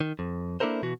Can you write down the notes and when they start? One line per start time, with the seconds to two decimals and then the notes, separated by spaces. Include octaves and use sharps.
0.01 D#3
0.19 F2
0.60 A#3 D4 E4 A4 A#4 C5
0.83 B2 E3 F#4